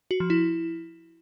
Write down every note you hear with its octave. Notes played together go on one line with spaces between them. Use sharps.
F#4
F3
E4